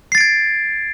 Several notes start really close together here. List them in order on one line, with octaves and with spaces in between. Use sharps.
C7 A6 D7 G#6